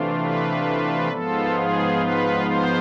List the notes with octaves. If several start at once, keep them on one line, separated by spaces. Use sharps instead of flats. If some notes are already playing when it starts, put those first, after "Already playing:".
Already playing: C3 E3 A3 D4 F4
B4
G#2 F3 B3 F4 A4
G#4
B4
C5